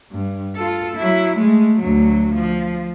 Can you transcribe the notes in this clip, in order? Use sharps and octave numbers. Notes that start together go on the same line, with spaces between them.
G2
F4 A4
F#3 E4
G#3 A3
D2 F#3
F3